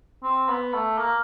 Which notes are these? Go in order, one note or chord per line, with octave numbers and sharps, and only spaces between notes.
C4
B3
A3
A#3